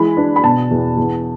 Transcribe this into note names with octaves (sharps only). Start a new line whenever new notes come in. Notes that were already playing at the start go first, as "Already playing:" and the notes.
Already playing: E3 G#3 B5
D4
B5
B2 A5
E2
E2